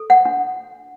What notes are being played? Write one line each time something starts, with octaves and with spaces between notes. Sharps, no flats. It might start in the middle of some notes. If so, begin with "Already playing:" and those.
Already playing: A4
F#5
D4